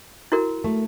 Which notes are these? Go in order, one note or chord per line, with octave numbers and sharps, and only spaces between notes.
E4 F#4 A#4
A3